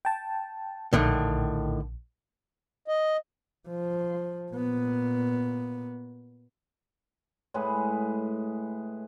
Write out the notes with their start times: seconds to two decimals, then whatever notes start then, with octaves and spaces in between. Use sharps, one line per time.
0.05 G5 A5
0.93 A#1 A2 D3 D#3
2.88 D#5
3.68 F3
4.51 A#2 B3
7.54 A2 G#3 G#4 B4